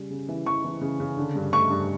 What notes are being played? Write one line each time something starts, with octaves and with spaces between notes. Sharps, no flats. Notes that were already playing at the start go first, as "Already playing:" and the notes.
Already playing: C#3 G3
C#3
E3
E3 C#6
E3
C#3
C#3
D3
G2
A3 C#6
G2